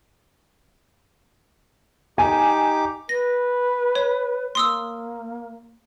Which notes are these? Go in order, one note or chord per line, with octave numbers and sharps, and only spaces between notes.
D#4 G4 G#5 D6
B4 A#6
C#5
A#3 C6 D#6 E6